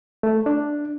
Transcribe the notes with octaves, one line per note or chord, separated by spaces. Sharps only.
A3
D4